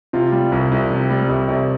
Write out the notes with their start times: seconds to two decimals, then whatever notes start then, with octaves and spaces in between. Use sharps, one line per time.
0.13 C3 F4
0.32 G3
0.52 C2
0.71 C2
0.90 C3
1.10 G3
1.29 C2
1.48 C2